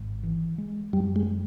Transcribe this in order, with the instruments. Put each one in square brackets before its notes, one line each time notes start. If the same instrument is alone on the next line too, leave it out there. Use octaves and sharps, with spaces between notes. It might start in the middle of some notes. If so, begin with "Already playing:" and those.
Already playing: [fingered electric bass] G#1
E3
G#3
[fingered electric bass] F#2 [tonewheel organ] G3
[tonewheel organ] G#3